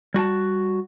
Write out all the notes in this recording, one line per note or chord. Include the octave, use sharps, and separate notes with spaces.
G3 F#4 G#5 A5